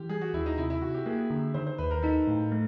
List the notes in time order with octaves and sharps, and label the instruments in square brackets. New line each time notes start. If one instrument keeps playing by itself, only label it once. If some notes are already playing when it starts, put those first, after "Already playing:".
Already playing: [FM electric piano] E3 [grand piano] G4
[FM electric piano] G3 [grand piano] G#4
[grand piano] F#4
[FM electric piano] D#2 [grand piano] E4
[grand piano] D#4
[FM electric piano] C3 [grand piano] E4
[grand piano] E4
[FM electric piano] C3 [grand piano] F#4
[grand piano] G4
[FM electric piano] A#3 [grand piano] G#4
[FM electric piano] D3
[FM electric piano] D#3 [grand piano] C5
[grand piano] C5
[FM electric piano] D#2 [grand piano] B4
[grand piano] A#4
[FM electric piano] D#4 [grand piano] A4
[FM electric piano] A2
A3